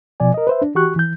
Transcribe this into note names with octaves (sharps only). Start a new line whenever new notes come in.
B2 F3 D5 G#5
A#4 D#5
B4 C5 E5
D4
E3 F#4 G4 C#6 F#6
E3 G6